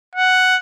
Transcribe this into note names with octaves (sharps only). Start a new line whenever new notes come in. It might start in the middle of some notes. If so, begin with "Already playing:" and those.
F#5